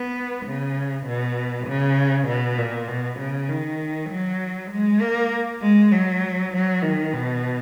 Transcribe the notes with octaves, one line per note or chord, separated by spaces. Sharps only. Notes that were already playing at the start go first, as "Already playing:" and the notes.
Already playing: B3
C#3
B2
C#3
B2
A#2
B2
C#3
D#3
F#3
G#3
A#3
G#3
F#3
F#3
D#3
B2